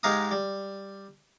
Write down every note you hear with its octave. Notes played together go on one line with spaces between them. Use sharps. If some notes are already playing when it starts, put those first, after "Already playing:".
G#2 G#3 G4 F5 A#5 D#6
G3